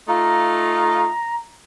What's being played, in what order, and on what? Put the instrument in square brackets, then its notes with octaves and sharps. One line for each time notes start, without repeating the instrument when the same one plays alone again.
[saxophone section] A3 D#4 F4 [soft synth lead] A#5